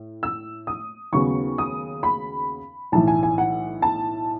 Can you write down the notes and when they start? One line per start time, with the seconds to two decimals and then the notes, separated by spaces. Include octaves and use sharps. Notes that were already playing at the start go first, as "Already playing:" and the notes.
Already playing: A2
0.23 E6
0.67 D#6
1.13 D#2 C#3 F#3 B3 C#6
1.58 D#6
2.03 B5
2.92 B1 A2 E3 A5
3.08 G#5
3.23 G#5
3.38 F#5
3.82 A5